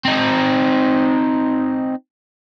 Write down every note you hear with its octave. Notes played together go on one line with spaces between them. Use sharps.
C4 D#4